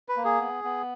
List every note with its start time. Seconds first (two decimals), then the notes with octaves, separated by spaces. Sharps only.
0.09 B4
0.17 A#3
0.25 G#4
0.40 B3
0.64 B3